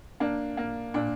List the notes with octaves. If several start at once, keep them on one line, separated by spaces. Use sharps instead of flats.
A#3 D4
A#3
A#2 D4